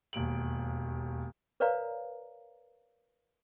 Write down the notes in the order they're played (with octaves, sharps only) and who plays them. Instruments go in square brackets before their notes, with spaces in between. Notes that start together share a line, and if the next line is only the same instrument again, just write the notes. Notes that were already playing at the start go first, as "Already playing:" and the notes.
[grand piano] E1 D#2 D7 F#7
[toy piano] A#4 B4 C#5 D5 F5 A#5